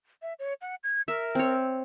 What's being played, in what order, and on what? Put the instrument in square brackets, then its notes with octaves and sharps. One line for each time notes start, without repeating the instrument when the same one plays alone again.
[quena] E5
C#5
F#5
G#6
[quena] A#4 [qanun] E5
[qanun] C4 C#5